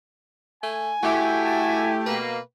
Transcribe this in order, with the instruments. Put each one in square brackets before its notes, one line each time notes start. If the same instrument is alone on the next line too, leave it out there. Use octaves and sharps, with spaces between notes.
[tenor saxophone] A3 [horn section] G#5
[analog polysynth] A3 G4 [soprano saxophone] E4 [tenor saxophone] F#4
[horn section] G#5 A5
[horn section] B2 A#3 [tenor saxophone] B4